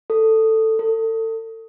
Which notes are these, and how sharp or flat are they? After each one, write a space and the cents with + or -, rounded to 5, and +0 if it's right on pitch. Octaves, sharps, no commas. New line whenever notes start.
A4 +10
A4 +30